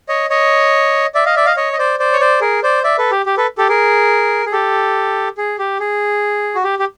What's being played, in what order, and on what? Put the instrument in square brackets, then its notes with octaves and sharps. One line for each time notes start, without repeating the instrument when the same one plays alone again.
[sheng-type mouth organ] C#5 D#5
C#5 D#5
D5 E5
D#5 F5
D5 E5
D#5 F5
C#5 D#5
D#5
C5 D5
C5 D5
C#5
C5 D5
G#4 A#4
C5 D5
D5 E5
A4 B4
G4
G4
A4 B4
G4 A4
G#4 A#4
G#4
G4 A4
G#4
G4
G#4
F#4
G4
G4